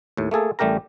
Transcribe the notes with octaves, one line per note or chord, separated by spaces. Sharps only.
D#2 A2
A3 A#3 G#4 A4
A1 G3 A3 G4 A#4 A#5